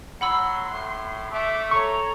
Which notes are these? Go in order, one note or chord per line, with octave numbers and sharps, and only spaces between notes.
F#3 F#5 B5 C6 E6
A2
A3 E5 D6
A4 C#5 A#5 C#6